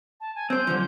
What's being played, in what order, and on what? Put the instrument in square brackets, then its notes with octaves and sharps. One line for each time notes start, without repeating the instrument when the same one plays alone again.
[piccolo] A5
G#5
[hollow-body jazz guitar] C4 C5 [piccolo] G6
[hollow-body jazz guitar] F#2 D3 F3